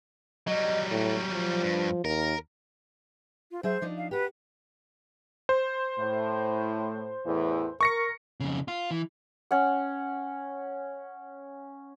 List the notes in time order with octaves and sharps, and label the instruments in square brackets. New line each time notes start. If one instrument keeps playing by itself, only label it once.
[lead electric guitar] F#3 G3 [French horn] D#5
[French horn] A2
F3
[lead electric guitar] G2
[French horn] D#2 [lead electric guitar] A#4
[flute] F4
[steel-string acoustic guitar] F#3 G#4 E5 [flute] C5
[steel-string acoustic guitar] F3 D4 D#4
[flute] F5
[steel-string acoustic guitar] F#4 G4 [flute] B4
[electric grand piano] C5
[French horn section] A2
E2 A2 E3
[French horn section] A#4 [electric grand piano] C#6 A#6 C#7
[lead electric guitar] F2 C#3
F4
E3
[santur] C#4 F#5